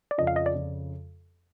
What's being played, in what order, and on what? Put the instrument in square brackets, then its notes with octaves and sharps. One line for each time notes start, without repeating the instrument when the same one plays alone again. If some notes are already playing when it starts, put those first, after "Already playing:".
[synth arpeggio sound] D5
[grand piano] F2 C#3 F3 [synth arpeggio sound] D#5
[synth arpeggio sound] F5
D#5
D5
[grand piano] F2 C#3 F3